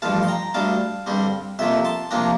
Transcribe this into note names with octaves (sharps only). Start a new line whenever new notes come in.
A1 G2 F3 F5 A5
C6
G5 A#5
D2 D3 G3 F5 A5
G2 D3 G3 C4
F2 C3 F3 A#3 E5 G5
A5 C6
C3 F3 A#3 D4 G5 A#5